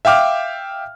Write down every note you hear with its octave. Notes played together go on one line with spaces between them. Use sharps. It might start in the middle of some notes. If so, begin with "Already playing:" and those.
E5 F5 G5 D6 F6